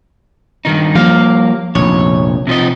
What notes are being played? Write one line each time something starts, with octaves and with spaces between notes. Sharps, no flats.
G2 D#3 D#4
F3 G3 A#3 F5
F1 A#1 C#5
C3 F3 D#5